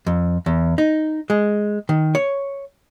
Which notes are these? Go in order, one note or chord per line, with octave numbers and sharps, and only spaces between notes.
F2
E2
D#4
G#3
D#3
C#5